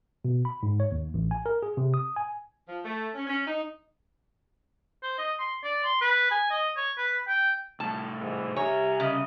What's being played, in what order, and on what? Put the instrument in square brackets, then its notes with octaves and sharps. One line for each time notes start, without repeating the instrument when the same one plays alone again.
[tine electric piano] B2
B5
G#2
C#5
D#2
A1
G#5
A#4
G#4
C3
D#6
G#5
[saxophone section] F3
A3
C#4
C#4
D#4
[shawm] C5
D#5
C6
D5
C6
B4
G#5
D#5
C#5
B4
G5
[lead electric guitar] C2 A2 [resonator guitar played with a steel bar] A5
[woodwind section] G#2 E3
[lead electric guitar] C2 E5 [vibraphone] G4 [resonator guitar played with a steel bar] C#5 [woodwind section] G#5 A#5
[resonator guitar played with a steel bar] C#3 [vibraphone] C#4 [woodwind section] D#5